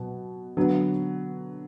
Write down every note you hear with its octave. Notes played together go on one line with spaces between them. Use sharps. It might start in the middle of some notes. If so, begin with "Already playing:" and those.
Already playing: B2 F#3 B3
D3 F#3 B3